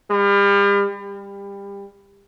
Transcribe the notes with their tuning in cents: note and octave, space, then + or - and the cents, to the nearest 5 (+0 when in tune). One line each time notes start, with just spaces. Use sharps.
G3 +40
G3 +25